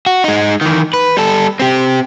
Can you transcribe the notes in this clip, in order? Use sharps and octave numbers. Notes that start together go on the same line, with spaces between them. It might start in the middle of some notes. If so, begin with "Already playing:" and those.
F#4
G#3 D#4
D#3 E3
B4
G3 A4
C4 G4